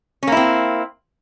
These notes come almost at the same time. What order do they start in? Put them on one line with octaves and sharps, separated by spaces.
C#4 A#3 E4 C4